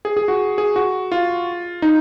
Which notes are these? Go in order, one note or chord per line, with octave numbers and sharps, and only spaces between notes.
G#4
G#4
F#4
G#4
F#4
F4
D#4